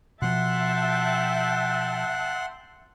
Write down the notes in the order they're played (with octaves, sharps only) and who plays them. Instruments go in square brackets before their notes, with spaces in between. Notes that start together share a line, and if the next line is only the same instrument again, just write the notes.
[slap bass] B2 F3 [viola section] E5 G5 A5 [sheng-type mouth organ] F#5 C6 F#6